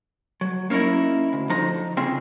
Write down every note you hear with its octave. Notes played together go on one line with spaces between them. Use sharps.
F#3
A#3 C#4 D#4 E4 A#4
D2
D3 F3 D#4 A#5
C#3 C4 F4 G#4